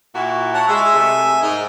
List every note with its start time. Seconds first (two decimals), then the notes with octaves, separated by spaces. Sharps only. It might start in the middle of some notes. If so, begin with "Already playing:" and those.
0.15 A#2 E4 F#4
0.54 C#5 F#5 A5
0.68 G#3 E5 G#5 E6
0.94 C3 A3
1.42 G#2 A#4 D#5